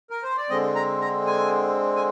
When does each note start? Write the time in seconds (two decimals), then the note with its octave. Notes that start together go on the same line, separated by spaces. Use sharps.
0.10 A#4
0.23 C5
0.37 D5
0.50 D3 G#3 C4 D#5
0.75 A#5
1.01 A#5
1.27 G#5
1.96 G#5